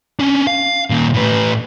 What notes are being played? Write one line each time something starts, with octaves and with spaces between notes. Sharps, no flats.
C#4 D4
F5
D#2 A#2
A2 B4